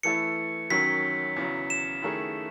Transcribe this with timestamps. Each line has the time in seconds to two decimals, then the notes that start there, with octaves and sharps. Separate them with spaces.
0.03 E3 A3 E4 A4 C#7
0.70 F#2 D#3 F#3 C#4 B6
1.36 E2 C#3 F#3
1.70 E7
2.02 F#2 D#3 A3 E4 G#4